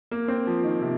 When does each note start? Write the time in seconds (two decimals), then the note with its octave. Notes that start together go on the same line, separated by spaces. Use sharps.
0.11 A#3
0.28 C4
0.47 F3
0.63 D#3
0.81 C3